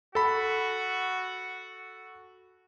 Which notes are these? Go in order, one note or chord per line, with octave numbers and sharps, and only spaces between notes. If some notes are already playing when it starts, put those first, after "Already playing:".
F#4 A4 B5